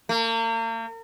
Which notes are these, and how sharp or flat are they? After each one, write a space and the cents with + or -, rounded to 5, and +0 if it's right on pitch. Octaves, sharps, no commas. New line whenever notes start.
A#3 -40